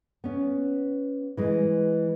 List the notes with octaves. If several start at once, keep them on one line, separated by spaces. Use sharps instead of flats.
B3 C#4
E3 G#3